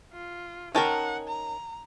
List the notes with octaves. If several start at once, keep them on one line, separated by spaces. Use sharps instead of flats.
F4
C#4 D#4 A#4 F#5 G5 A5
A#5